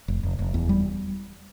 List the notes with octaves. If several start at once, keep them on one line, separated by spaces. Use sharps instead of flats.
F1
F1
F1
E2
G3